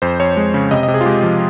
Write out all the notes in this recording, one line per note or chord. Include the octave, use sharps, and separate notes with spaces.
F2 C5
F2 C#5
G#3
C#3
C3 D#5
D#5
C3
G#4
F4
G#3 G4
F3